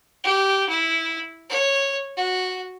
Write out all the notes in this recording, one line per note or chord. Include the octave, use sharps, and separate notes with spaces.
G4
E4
C#5
F#4